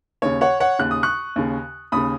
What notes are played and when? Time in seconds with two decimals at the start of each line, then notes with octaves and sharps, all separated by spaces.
0.22 D#2 C#3 C#5
0.41 C#5 F#5
0.60 C#5 F#5
0.79 D#2 C#3 F#6
0.91 D#6
1.03 C#6 F#6
1.36 D#2 C#3
1.92 D#2 C#3 B5 D#6